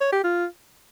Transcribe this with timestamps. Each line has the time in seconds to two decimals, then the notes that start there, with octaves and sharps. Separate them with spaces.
0.01 C#5
0.12 G4
0.24 F4